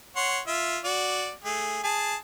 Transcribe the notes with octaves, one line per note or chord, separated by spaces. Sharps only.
C#5 F#5 C6
F4 E5
F#4 D5
A3 G#4
G#4 A5